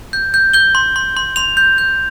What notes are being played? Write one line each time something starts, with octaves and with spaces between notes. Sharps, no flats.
G6
G6
G6 G7
C6
C6
C6
C6 F7
G6
G6